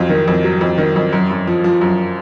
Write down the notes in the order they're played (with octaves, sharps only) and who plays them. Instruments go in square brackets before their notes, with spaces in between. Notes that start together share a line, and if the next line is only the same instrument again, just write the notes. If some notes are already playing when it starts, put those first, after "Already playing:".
Already playing: [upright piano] F2 F#3 F4
D#3
F2
F#3
F2
D#3
F2
F#2
F#2
F3
F3
F#2